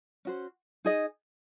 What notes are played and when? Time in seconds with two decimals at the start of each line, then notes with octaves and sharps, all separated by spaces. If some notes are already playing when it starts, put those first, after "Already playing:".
0.25 C#4 F#4 C5
0.85 D#4 G#4 D#5